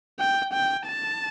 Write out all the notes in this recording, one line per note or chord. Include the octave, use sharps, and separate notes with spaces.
G5
G5
A5